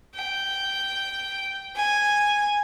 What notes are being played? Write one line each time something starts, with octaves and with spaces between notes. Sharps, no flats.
G5
G#5